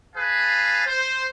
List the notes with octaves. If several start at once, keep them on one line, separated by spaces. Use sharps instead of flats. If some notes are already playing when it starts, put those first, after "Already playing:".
G#4 B4 F5 A5
C5